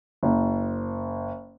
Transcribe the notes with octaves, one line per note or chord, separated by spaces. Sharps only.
F#1